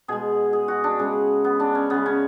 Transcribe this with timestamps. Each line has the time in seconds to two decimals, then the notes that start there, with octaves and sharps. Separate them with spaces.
0.08 B2 G#3 G#4
0.53 G#4
0.68 F#4
0.84 D4
0.99 C#3 G#3
1.44 B3
1.60 D4
1.75 C#4
1.90 C#3 G#3 B3
2.06 C#4